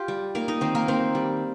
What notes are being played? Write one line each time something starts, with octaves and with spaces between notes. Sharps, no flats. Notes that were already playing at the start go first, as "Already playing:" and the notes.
Already playing: F4 G4
G3
A#3 D#4 A#4
D#4 D#5
D#3 C4 C5
A#3 A#4
D#3 C4 C5
G3